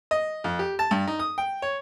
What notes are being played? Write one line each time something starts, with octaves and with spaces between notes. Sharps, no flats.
D#5
F2
G4
A5
G2
D#4
D#6
G5
C#5